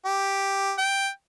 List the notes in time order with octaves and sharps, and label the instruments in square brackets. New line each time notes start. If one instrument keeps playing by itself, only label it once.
[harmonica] G4
G5